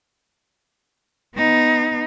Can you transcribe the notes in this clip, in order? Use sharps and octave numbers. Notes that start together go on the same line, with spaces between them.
B3 D#4